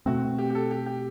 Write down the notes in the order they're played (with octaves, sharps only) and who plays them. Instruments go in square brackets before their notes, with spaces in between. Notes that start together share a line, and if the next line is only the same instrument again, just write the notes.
[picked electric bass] B2 A3 C4 [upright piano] F#4
[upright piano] G4
G4
A4
G4
G4